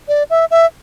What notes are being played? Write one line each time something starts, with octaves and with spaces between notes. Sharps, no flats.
D5
E5
E5